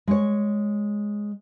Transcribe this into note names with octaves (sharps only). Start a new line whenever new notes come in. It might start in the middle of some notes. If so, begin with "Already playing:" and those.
G#3 C#5